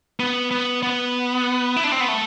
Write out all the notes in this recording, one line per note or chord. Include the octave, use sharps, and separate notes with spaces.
B3
B3
B3
E4
D4
C4
B3
A3